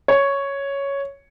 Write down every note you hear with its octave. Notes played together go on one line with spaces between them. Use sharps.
C#5